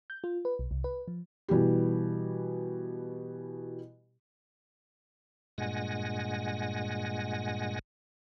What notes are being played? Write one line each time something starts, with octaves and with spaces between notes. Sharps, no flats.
G6
F4
B4
B1
C2
B4
F3
B2 E3 G3 G4
G2 A#2 G#3 F#5 G#5 A#6